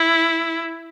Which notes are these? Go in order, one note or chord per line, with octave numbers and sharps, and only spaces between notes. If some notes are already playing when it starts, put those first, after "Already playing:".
Already playing: E4